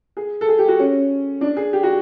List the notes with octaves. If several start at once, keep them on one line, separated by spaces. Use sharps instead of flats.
G#4
A4
G#4
G4
F#4
C#4
D4
G#4
G4
F#4